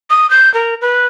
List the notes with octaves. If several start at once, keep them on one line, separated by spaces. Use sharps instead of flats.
D#6
G6
A#4
B4